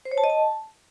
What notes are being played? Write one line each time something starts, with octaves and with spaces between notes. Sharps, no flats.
C5
C#5
A5
D#5
A5